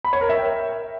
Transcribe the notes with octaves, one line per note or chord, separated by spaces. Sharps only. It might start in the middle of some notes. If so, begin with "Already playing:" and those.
B5
C#5
A#4
E5
G5